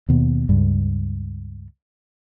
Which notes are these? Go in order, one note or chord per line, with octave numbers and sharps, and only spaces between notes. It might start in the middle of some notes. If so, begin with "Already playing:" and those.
D#2 B2
C#2 G2